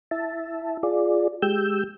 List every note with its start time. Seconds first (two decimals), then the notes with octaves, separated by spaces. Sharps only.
0.11 E4 E5 A5
0.83 F4 G#4 D5
1.42 G#3 G4 E6 G6